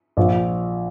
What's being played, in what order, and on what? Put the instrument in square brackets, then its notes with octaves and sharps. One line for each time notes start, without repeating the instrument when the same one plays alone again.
[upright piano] A#1